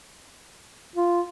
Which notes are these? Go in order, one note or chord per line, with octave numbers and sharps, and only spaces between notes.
F4